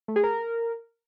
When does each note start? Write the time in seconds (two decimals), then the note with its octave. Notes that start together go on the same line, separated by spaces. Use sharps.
0.08 A3
0.16 G#4
0.24 A#4